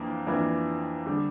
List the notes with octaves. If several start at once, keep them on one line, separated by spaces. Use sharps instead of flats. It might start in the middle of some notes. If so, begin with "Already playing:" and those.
Already playing: F2 E3 A#3 D4
F2 E3 A#3 D4
D3 G3 D4